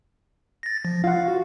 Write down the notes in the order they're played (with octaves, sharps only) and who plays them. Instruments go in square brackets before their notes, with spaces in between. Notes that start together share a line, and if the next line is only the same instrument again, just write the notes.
[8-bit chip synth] A6 A#6
F3
[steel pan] F4 F#5 [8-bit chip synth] F5
[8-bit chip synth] F#4